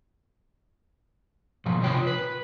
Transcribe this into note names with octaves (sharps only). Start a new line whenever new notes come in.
G#2 B2 F3
C3 F4 C#5 G5
B4